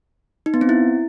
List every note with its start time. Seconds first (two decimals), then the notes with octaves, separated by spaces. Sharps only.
0.46 D#4
0.54 B3
0.61 C4
0.69 E4